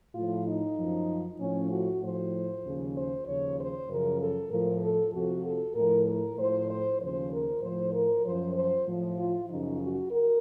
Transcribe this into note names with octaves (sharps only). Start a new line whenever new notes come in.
A2 F3 F4
D#4
F#2 F3
A2 F3 C#4
F#4
A2 F3 C5
D#2 C#3 F3
C5
D#2 C#3 F3 C#5
C5
F#2 C#3 F3 A#4
A4
A2 F3 A#4
A4
F2 C3 F3 F#4
A4
A2 F3 A#4
A#4
A2 F3 C5
C5
D#2 C#3 F3 C5
A#4
A2 F3 C5
A#4
F#2 F3 C5
C5
A2 F3
F4
F#2 C#3 F3 D#4
F#4
A#4